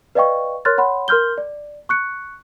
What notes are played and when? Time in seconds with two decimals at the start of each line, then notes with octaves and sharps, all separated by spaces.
0.15 B4 D5 D#5 F5 G5 C#6
0.65 A#4 C#5 C6 F6 F#6 A6
0.78 C#5 F#5 B5 C6
1.08 A#4 C6 F6 G6 G7
1.38 D5
1.89 C#6 F#6 C#7